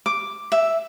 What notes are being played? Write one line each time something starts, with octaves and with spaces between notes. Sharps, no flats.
D6
E5